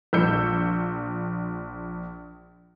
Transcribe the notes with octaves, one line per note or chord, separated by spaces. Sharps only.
A#1 E6 G6 C#7